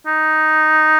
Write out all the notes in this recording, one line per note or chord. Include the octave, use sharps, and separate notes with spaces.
D#4